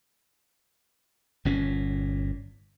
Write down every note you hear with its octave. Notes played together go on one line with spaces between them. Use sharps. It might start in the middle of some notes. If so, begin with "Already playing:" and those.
G1 A#2 C#4